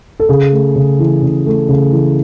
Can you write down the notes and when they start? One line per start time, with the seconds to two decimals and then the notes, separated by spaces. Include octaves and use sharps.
0.20 A4
0.29 C#3 G#4
0.52 A3
0.76 C#3
0.99 E3
1.22 C#3
1.46 A3
1.68 C#3
1.92 E3